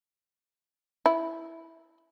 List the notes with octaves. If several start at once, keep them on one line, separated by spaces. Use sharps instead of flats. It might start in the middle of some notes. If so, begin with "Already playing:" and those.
E4